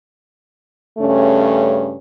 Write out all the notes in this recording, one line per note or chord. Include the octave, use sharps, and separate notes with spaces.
G2 C#3 A3 C#4